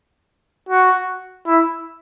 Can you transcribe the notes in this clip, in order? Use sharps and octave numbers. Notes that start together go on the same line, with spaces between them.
F#4
E4